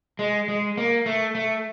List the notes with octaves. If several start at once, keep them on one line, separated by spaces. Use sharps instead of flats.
G#3
G#3
A#3
A3
A3